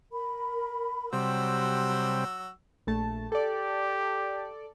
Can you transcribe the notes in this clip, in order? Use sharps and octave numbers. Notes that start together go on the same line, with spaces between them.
A#4 B5
C3 F#3 G3 F#4 C6 E6
A#1 A3 A5
G4 A4 D5